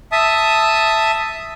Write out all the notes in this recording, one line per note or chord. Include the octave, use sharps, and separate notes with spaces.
E5 A5 D#6